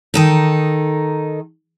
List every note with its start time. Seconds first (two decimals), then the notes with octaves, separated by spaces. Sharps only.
0.14 D#3 D#4 A4